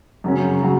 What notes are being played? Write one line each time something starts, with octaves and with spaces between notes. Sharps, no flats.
F#2 C#3 F#3 C#4
C#3 F#3